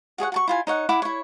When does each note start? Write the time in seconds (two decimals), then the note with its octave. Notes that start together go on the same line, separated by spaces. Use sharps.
0.18 F#4 G#4 C#5 F#5
0.32 F#4 A5 C#6
0.48 E4 F4 G#5
0.67 D#4 C#5 F#5
0.89 E4 F#5 D6
1.02 E4 C#5